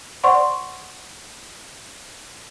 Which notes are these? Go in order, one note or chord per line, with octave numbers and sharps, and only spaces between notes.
C5 D5 F#5 C6 C#6